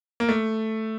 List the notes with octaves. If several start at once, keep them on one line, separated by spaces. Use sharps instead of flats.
A#3
A3